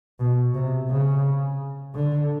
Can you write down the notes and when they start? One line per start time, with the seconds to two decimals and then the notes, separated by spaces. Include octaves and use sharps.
0.20 B2
0.54 C3
0.90 C#3
1.96 D3